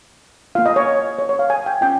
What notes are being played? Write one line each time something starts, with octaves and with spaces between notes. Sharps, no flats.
A#3 F4 F5
D#5
C#5
C#5
C#5
F5
G#5
G5
C#4 F4 G5